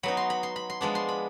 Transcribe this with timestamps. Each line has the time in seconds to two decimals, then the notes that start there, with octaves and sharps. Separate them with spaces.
0.03 F#3 B3 D#4 B5
0.17 C6
0.30 B5
0.43 C6
0.56 B5
0.70 C6
0.81 F3 G#3 B3 D4 B5
0.95 C6
1.09 B5